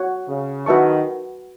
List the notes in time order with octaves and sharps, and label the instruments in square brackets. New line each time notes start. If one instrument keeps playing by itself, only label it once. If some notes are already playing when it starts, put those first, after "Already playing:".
Already playing: [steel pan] F#4 C#5 F#5
[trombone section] C#3
[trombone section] D#3 [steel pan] F#4 B4 E5 A5 C#6